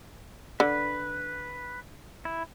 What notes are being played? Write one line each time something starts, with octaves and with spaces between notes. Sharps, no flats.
D3 B4
E4